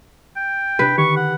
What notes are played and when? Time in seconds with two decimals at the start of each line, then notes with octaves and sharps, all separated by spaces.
0.36 G5
0.79 C3 D4 B4
0.98 D3 D#3 G4 C#6
1.16 F#5